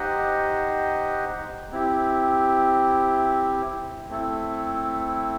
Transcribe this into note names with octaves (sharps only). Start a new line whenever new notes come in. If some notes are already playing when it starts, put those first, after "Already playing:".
Already playing: D#4 G4 C5 D#5 F#5
C4 E4 G4
A3 C4 E4 A4